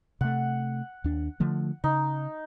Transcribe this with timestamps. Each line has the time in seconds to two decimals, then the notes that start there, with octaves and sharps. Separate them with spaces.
0.21 C3 A3 F#5
1.04 D#2 D4
1.40 D3 F3 A3
1.84 C#3 D#4